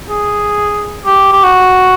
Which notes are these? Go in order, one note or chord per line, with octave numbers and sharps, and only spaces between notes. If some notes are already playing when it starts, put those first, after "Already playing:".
G#4
G4
G4
F#4